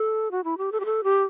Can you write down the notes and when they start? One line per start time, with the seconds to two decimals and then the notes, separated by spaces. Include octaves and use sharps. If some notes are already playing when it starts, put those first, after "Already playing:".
Already playing: A4
0.31 F#4
0.44 E4
0.58 G4
0.72 A4
0.80 G4
0.85 A4
1.04 G4